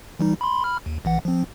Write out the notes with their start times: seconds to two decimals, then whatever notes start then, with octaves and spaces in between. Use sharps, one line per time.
0.19 E3 G3 D#4
0.41 B5 C6
0.64 B5 F6
0.86 D#2
1.05 A#1 E3 F#5
1.25 F3 C4